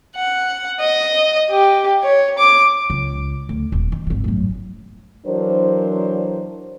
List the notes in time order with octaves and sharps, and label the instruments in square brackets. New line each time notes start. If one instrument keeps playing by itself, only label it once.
[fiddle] F#5
D#5
G4
C#5
D6
[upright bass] C#2
D2
D#1
D#3
G#1 D3
F#2 A2
[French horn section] E3 F#3 D4 A#4 C5